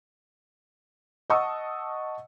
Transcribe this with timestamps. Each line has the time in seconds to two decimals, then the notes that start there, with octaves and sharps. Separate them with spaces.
1.30 D#5 F#5 A5 C#6 D#6 E6